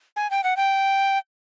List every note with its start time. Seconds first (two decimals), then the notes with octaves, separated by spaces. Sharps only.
0.16 G#5
0.31 G5
0.44 F#5
0.57 G5